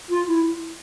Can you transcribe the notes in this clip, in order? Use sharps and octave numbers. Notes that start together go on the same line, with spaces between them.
F4
E4